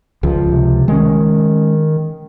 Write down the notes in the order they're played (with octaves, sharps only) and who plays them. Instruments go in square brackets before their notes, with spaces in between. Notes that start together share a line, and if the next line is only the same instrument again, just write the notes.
[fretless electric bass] C#2 F3
[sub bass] C3
[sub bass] D#3 [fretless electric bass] G#3 C#4